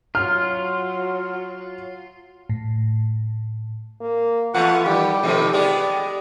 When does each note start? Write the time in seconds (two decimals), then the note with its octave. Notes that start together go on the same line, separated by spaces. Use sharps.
0.15 F#3 F4 F6
2.49 A2
4.01 A#3
4.54 E2 A3 B3 F4 F#5
4.86 D#3 G3 G4
5.23 B2 D#3 F3 A3
5.53 G#3 B3 G4 G#4 D5